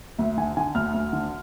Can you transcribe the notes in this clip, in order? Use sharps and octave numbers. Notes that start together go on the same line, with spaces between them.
D2 E5
D3 G#5
D3 G#5
D2 F6
D2
D3